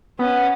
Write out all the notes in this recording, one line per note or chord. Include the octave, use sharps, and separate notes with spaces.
B3 C#4